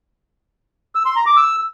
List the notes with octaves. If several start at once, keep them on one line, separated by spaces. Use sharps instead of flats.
E6
C6
A#5
D6
E6